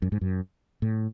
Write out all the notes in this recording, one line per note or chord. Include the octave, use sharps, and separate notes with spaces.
F#2
G#2
F#2
A2